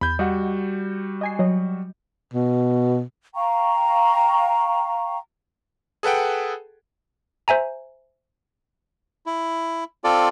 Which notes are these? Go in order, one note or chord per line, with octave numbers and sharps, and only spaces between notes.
E2 B5 G6
G3 F#4 D#5 F#5
D#5 G#5 C7
F#3 D#5
B2
F5 G5 A#5 C#6
G#4 A4 B4 F#5 G5
C5 E5 G#5 A#5
E4
C4 F4 A4 D5